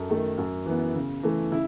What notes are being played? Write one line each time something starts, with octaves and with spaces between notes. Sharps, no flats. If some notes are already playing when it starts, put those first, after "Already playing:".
Already playing: F#2 A4
D#3 A3
F#2
E3 B3
C#3
E3 A3
C#3 E4